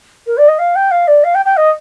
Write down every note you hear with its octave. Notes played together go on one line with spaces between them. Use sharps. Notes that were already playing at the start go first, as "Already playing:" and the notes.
A#4
D5
D#5
F5
G5
F5
D5
F5
G5
G5
D#5